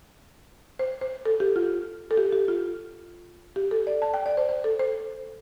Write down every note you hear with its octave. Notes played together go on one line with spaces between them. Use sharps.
C5
C5
A4
G4
F4
A4
G4
G4
F4
G4
A4
D5
A5
G5
D5
C5
C5
A4
C5